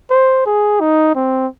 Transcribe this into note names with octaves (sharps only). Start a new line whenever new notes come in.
C5
G#4
D#4
C4